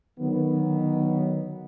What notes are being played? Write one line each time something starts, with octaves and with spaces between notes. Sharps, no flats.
D3 D#3 F#3 B3